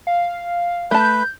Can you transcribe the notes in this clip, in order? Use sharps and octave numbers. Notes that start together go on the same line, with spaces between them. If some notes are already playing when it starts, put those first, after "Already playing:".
F5
A3 B4 A5 G6